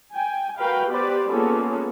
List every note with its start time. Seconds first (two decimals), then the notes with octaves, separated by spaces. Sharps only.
0.13 G5 G#5
0.57 F#4 A#4 B4 F5 G5
0.90 B3 G4 B4 C5 D5
1.32 A#3 B3 C#4 F4 G#4 A4